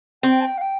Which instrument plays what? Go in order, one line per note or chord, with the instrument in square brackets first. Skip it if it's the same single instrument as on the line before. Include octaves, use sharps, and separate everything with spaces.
[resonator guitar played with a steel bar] C4 [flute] G5
[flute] A5
G5
F5
G5